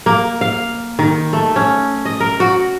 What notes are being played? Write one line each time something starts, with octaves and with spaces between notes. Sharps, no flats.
A#3
F5
D#3
A3
C#4
D#5
A#4
F#4